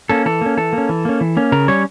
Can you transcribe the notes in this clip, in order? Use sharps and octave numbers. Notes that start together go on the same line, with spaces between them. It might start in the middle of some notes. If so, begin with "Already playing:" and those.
A#3 C#4 A4
E3 A4
A#3 C#4
E3 A4
A#3
C#4
E3
A#3 C#4
E3
A#3 C#4
C#3 A#4
G3 C#4 C#5